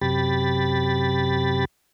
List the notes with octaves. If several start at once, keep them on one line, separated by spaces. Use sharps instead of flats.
F#2 C3 G4 B5 A6